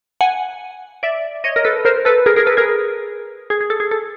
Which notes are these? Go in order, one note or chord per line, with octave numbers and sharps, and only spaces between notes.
F#5 G#5
D5 E5
C#5 D#5
A#4
A4 B4
A#4 C5
A4 B4
G#4 A#4
G#4 A#4
A4 B4
G#4 A#4
G#4
G#4
A4
G#4
A4